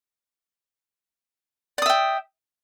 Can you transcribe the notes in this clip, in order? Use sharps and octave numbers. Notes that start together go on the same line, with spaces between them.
D5 E5 G5 D#6